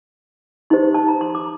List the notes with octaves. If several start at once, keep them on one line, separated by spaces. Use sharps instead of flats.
D#4 G4 C5 C6
A5
A#5
C6
D6